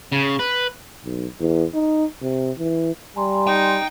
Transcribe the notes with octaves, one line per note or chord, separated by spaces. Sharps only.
C#3
B4
B1
E2
D#4
C3
E3
G3 G#5 A#5 C6
D#4 G5